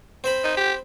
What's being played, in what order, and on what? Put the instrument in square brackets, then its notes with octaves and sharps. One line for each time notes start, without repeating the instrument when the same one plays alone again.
[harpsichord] C4 C5 B5
[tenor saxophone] D#4
G4